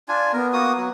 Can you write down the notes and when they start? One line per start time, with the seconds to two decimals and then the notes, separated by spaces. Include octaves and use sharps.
0.08 D4 F4 G#5
0.33 B3 A#4
0.53 A#3 F#4 D#6
0.77 F#3